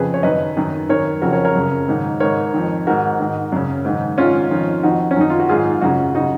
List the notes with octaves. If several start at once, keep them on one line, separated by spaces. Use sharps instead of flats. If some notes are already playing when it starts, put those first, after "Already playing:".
Already playing: F2 C#3 G#4 B4
C#5
F#2 D#3 B4 D#5
F#2 D#3
F#2 D#3 A#4 C#5
F2 C#3 F#4 A#4
A#4 C#5
A#4 C#5
F#2 C#3
G#2 D#3
G#2 D#3 A#4 C#5
F2 D#3
G#2 D#3 F#4 A#4
G#2 D#3
F#2 C#3
G#2 D#3
G#2 D#3 C#4 F4
F2 D#3
F2 D#3 D#4 F#4
C#4
F#2 D#3 D#4
F4
F#4
G#2 D#3 F4 G#4
F#2 C#3 D#4 F#4
C#3 D#4 F#4